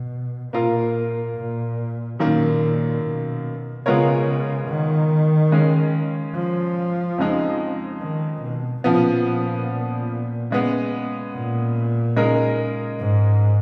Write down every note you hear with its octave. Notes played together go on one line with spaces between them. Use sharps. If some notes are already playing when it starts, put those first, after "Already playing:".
Already playing: B2
A#2 A#3 F4 A#4
A#2
F#2 A#2 D#3 A#3
B2
C#3 G#3 B3 F4 A#4 C#5
D#3
C#3 G#3 C#4
F3
F2 C#3 G#3 D#4
D#3
B2
A#2 C#3 F3 B3
C#3 G#3 B3
A#2
C#3 G#3 D#4 A#4
G#2